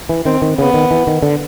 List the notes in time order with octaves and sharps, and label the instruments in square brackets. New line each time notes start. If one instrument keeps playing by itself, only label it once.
[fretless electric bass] E3
[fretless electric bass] D#3 [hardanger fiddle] C4
[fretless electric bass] D#3
[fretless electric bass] C#3 [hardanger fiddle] B3
[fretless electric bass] D#3
E3
D#3
D3